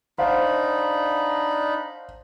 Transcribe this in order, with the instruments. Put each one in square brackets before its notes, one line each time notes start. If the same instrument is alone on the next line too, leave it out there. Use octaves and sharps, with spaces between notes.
[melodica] D4 D#4 B5 [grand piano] C5 F5 F#5